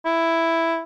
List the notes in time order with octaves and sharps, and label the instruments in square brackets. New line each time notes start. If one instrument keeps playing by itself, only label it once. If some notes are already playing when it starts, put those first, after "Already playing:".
[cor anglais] E4